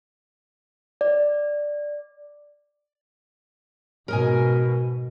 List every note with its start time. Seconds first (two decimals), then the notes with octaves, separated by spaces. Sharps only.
1.01 D5
4.08 G#2 B2 A#4 D#5 G#5